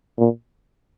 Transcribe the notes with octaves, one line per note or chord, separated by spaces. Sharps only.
A#2